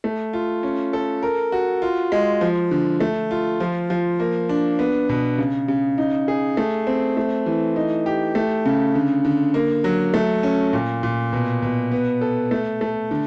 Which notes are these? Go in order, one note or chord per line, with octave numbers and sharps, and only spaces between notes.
A3
F4
C#4
A4
A#4
F#4
F4
G#3
F3
D3
A3
F4
F3
F3
A#3
D4
B3
B2
C#3
C#3
D#4
G#4
A3
C4
A3
E3
D#4
G4
A3
C#3
D3
D3
A#3
F#3
A3
C#4
A#2
A#2
B2
B2
B3
A4
A3
A3
D3